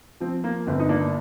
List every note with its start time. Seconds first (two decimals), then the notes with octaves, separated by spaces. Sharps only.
0.20 F3 C4
0.44 A#3
0.67 G1 C4
0.80 D#4
0.89 A#3 D4